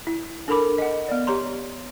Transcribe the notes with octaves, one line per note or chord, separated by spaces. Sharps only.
E4
D4 A4 A#4 B5 D6
D#5 F#5
B3 D5
G4 C#5 A#5 C6